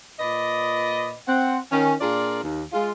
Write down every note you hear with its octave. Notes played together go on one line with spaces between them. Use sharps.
A#2 B4 D5 D#5
C4 F#5
D#3 C#4
A#2 D4 F4 G#4 A#4 D5
D#2
G#3 F4